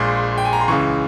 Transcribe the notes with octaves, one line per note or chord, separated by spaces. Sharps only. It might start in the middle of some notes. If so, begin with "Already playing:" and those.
Already playing: A#1 A#2 G#3 C6
G5
G#5
A#5
C6
C#2 C#3 E3 C#6